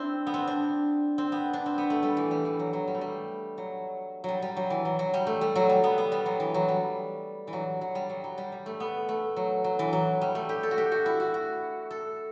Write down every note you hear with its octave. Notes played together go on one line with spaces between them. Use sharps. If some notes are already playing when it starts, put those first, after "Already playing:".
Already playing: C4 D4 E4
B3
C4
D4
C4
B3
D4
C4
B3
A3
G3
E3
G3
E3
F#3
F#3
G3
A3
G3
F#3
F#3 G3
G3
F#3
E3
F#3
F#3
G3
A3
G3
F#3
G3
B3
B3
G3
F#3
E3
F#3
G3
E3
F#3
F#3
G3
F#3
F#3
G3
G3
A3
B3
A3
F#3
F#3
E3
F#3
G3
A3
G4
A4
F#4
G4
F#4
E4
F#4
F#4
A4